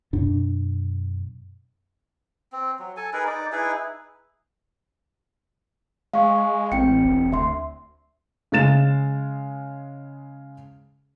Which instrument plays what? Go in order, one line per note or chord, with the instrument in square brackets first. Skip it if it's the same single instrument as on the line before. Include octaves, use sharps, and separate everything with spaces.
[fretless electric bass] F#2 B2 D4
[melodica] C4
F#3
A4 G#5
D#4 G#4 A#4 B4
D#4 D5
D#4 E4 G#4 B4
[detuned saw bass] G#3 [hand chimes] F5 C#6
[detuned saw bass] A1 [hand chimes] C4 G5 C#7
[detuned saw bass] E1
[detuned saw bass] D2 [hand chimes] E5 C6
[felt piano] C#3 G#3 A6 E7